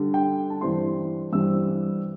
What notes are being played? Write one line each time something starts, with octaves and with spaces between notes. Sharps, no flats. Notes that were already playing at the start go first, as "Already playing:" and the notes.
Already playing: D3 G3 D4
G5
A5
G2 E3 G3 C4 C6
G2 E3 G3 C4 E6